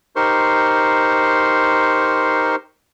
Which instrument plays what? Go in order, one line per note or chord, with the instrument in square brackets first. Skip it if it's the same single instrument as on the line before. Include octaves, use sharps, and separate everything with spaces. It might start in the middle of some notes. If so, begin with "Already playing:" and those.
[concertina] D#4 G4 A#4 C5 C6 C#6